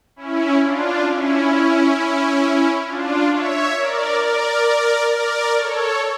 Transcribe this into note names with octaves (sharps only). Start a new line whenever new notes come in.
C#4 E4
D4 F4
C#4 E4
D4 F4
C#5 E5
A#4 D5
A#4 D5
A#4 D5
A4 C#5